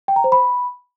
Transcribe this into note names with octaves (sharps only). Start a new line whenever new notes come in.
G5
A#5
C5
B5